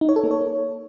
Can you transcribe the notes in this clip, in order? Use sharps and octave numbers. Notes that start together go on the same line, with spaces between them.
D#4
C#5
A4
A#3
C#5